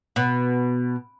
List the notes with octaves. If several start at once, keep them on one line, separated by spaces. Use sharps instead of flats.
B2